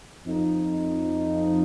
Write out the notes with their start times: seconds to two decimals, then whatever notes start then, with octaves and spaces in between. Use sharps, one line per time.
0.24 F2 F3 D#4